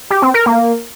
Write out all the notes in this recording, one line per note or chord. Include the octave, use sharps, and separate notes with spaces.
G4
C4
A#4
A#3